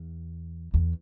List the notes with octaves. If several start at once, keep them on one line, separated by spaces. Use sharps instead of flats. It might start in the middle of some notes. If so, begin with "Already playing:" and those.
Already playing: E2
E2